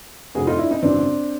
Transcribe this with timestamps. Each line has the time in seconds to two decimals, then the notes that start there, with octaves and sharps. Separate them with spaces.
0.35 F1 F2 D3 F#4 G#4
0.47 D#4 F4
0.59 D4 E4
0.71 C#4 D#4
0.82 G#1 F#2 C#3 E3 C4 D4